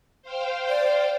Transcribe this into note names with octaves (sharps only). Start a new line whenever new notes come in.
C5 F5 G5
D5